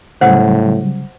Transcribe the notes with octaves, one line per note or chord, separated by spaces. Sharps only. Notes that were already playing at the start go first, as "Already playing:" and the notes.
A2 C#3 F#3 G3 C5 F#5